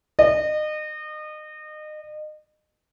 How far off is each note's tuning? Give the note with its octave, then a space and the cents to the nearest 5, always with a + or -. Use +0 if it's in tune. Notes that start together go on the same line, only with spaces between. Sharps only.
D#5 -30